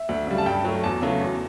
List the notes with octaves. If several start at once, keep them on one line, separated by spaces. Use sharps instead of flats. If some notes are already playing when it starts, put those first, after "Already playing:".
Already playing: E5
D2
C#3 G3
A5
G2 G5
F#3 A3
E2 A5
C#3 F#3 A3
E2